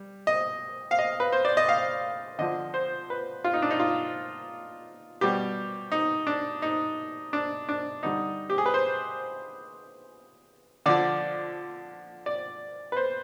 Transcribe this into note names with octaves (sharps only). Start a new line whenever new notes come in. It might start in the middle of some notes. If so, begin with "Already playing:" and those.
Already playing: G3
D#5
F5
D#5
B4
C5
D5
D#5
F5
D3 F3 D#5
C5
B4
F4
D#4
D4
D#4
F4
B2 G3 G4
D#4
D4
D#4
D4
D4
D3 G3 D#4
G4
G#4
B4
C5
D3 F3 D5
D5
B4
C5